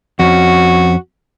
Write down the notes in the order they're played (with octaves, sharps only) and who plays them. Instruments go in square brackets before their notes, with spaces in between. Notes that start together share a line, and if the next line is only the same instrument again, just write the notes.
[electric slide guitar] F2 C#4 [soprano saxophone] F#4